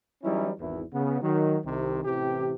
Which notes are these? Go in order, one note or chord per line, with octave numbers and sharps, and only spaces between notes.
E3 F#3 G3 C#4 D#4 E4
G#1 E2 E4
C#3 B3
D#3 F#3
C2 C3 D#3
A1 C3 E3 G4